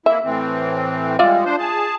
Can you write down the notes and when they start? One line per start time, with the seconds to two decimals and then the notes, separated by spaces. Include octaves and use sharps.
0.06 A#3 E4 E5
0.24 A2 E3 C4
1.19 G3 G#3 F4 D5 E5
1.45 D4 C5
1.59 G#4 A5